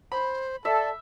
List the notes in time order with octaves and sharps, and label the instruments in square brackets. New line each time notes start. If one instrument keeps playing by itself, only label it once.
[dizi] C5 [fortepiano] B5
[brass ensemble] A4 [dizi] D5 [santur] E5